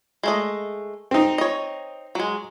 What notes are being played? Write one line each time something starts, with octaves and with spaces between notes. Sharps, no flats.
G#3 A3 D#5
C4 D#4
C#5 D#5
F#3 G#3